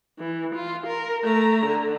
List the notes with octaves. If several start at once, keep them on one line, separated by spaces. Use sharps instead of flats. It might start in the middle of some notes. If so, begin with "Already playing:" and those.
E3
F4
A#4
A3 A#5
D3